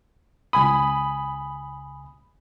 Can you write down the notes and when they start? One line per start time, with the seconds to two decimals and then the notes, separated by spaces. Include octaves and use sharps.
0.53 C#2 G#5 B5 D#6